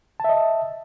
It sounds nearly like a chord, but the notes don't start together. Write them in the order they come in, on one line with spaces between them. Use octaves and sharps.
A5 E5 D#5